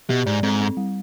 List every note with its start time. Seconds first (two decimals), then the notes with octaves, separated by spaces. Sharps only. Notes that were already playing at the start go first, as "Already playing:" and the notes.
0.09 B2 G4
0.26 G#2 D5
0.43 G#2 C4
0.61 C4
0.77 G3